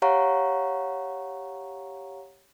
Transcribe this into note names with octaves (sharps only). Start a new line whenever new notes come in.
G4 C#5 F5 F#5 A#5 C#6